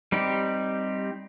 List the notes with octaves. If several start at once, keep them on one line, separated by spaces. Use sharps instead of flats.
G3 C4 D#4 G4